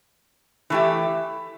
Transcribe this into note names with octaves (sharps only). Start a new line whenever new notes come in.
E3 A3 E4 G4